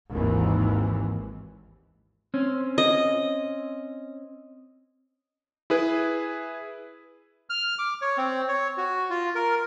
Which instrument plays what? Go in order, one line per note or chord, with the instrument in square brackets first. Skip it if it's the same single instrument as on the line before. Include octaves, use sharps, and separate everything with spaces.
[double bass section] G#1 D#2 E3
[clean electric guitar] C4 C#4
[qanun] D#5
[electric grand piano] E4 G#4 B4
[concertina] F6
D6
C#5
C4
C#5
F#4
F4
A#4